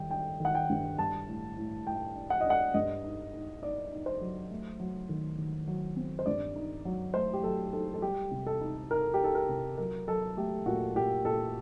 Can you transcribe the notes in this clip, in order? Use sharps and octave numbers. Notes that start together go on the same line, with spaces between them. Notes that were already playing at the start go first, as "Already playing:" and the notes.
Already playing: D#3 G3 G5
D4 G5
D#3
F#5
G5
G2
G3 A5
A2
A2
A2 G5
D4
F#5
D4 D#5
F#5
G2 D#5
D#4
D#4
D#4 D5
D#4
C5
F#3
A3
F#3
D#3
D#3
F#3
C4
C5
G2 D5
D#4
F#3
A3 C5
G4
F#3 A4
D#4 A4
A4
G3 G4
C3
A4
D#4
D#4 A#4
G4
D#4 A4
A#4
C3
F#3 A#4
F#3 A4
A3 G4
A#2 F#4
A#2 G4
A#2 A4